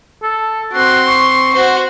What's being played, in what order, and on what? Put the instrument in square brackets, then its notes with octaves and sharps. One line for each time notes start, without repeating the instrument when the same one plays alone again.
[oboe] A4
[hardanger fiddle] C4 C6 [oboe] F#4
[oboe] C#6
[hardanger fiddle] F#4 C5